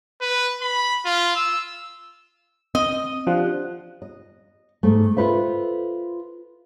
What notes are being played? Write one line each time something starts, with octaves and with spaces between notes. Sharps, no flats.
B4
B5
F4
E6
C4 D#5
F3 D4 G4 F#5
D#5
G#2 A3
F4 A4 B4 C5 E5